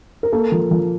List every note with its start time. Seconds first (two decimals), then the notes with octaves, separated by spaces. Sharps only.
0.23 A#4
0.32 A#3 A4
0.52 F3
0.71 F3